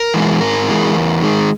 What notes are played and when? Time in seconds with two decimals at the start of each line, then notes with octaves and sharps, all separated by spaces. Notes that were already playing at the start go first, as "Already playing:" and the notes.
Already playing: A#4
0.14 E3 G#3
0.41 G#2 A#4
0.68 E3 G#3
0.95 E2
1.22 D#3 G#3